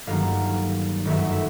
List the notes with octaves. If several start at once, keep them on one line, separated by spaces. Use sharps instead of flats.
G1 G2 D#3 F#3 A#3 F5
G1 F#2 D#3 F#3 A3 E5
E5